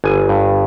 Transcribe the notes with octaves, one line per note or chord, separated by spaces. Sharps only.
G1 G#5
G2